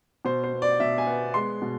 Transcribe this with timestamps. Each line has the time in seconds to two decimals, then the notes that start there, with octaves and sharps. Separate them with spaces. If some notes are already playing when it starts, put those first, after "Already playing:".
0.25 B2 C5
0.44 C5
0.52 B3
0.62 D5
0.80 B2 E5
0.98 G#5
1.07 B3
1.34 G#3 C6
1.62 B2